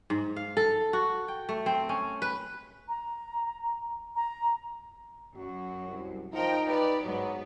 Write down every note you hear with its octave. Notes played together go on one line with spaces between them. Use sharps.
G#2
F5
A4
F#4
G5
A3
C4
C#4
B4
A#5
A#5
F#2 F#4
C2
F3 D#4 A#4 G5
G4 B4 D5
G#2 F#3 B3